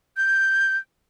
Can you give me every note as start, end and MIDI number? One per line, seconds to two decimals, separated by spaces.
0.17 0.77 91